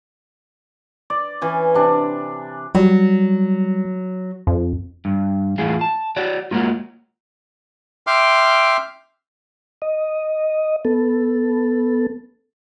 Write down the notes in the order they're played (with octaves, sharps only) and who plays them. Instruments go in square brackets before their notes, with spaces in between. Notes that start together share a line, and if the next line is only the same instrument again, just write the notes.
[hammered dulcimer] D5
E3 C#4 G#5
C3 D4
[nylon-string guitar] F#3 [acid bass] G3
[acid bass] F2
[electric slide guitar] G2
E2 A2 F4 G#4
A5
F#4 C#5 D5
F#3 G#3 A#3 F4
[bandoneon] E5 G5 C6 D6 F6
[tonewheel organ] D#5
B3 A4